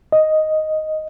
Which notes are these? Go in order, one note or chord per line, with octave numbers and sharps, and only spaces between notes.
D#5